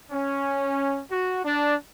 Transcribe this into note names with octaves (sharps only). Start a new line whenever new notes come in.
C#4
F#4
D4